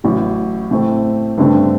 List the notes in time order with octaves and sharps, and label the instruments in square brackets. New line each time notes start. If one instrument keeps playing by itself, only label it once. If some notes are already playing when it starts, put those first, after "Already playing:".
[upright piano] A1 A2 F#3
A2 A3 C4
G2 D3 A3 C4